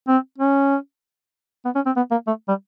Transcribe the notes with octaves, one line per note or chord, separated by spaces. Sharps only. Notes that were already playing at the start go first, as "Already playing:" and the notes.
C4
C#4
B3
C#4
C4
B3
A#3
A3
G3